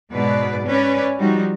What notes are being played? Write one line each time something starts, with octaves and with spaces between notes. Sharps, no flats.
G#2 B2 B4 D5
C#4 B4 D5
F3 G3 D#4 F#4